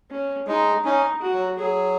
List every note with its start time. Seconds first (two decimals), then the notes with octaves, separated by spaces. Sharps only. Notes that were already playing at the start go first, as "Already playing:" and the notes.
0.11 C#4
0.48 G#3 D#4
0.85 C#4 D#4
1.21 F#4
1.34 F#3
1.58 F#3 G#4